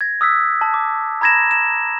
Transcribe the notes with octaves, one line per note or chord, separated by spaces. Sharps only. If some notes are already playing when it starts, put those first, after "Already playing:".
G#6 A#6
D#6 E6 F#6 B6
A5
D6
A#5 B5 G#6 A#6 E7
E7